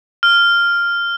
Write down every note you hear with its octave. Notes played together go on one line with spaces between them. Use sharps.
F6